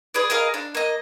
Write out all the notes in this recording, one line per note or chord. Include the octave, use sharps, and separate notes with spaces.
G#4 B4 D5
G#4 A#4 D#5 F5
D4
A#3 D#5